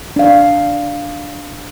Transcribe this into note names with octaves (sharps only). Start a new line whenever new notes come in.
D4 F5